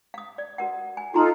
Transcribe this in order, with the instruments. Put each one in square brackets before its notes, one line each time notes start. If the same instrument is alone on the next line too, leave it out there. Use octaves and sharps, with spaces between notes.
[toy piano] F5 D#6
D5
F#4 A#4 F#5
G#5
[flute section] D#4 F4 A4 [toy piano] F#4 A#5 C6